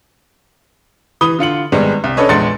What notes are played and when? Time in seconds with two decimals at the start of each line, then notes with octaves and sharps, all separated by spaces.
1.21 E3 B5 D#6 G7
1.39 D3 F4 C#7 F#7
1.72 G#1 G3 G#3 B3
2.04 C2
2.17 C#4 D4 A4 B4 C#5 D#5
2.29 A#1 E2 G#3 C6 A6 C#7